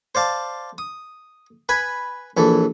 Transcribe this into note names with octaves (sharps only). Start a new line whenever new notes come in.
C5 D5 F5 A5
D#6
B4 G#5 B5
A#1 E3 A4